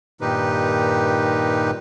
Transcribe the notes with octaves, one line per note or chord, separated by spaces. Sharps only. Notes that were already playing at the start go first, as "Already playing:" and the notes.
G2 A#2 D#3 D#4 G4 B4